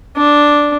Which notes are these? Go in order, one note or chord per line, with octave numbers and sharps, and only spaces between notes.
D4